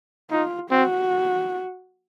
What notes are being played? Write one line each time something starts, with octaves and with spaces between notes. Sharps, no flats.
D#4 F4
C4 F#4